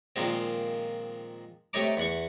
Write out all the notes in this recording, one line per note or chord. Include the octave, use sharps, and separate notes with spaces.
A#2 D#3 F3 G#3 C4
C3 A3 D#4 C#5 A#5 D6
E2 F#5 C#6